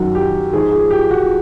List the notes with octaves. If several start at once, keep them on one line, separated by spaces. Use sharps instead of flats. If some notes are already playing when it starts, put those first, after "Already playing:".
Already playing: F#2 D#3 F#3 F#4
G4
G#2 F3 G#4
G#4
G4
F#4